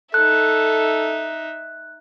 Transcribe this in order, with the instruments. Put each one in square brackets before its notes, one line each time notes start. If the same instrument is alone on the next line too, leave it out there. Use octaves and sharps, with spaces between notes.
[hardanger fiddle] D#4 E5 [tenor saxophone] A4 [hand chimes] F#6